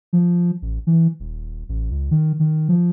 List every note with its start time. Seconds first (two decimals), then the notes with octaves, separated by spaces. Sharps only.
0.13 F3
0.62 A1
0.87 E3
1.20 D#1
1.69 A1
1.91 C#2
2.11 D#3
2.40 D#3
2.69 F3